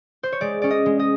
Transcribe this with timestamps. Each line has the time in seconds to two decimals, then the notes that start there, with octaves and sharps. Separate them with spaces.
0.23 C5
0.32 C#5
0.41 G#3 D5
0.62 C#4 D5
0.70 D#5
0.86 G#3
0.99 D#5